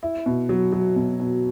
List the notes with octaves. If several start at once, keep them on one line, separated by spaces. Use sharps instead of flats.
E4
B2
F#3
F#3
B2
B2